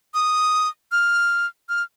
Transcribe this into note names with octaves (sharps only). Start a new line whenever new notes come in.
D#6
F6
F6